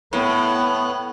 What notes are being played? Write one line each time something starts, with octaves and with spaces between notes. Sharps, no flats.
A2 B3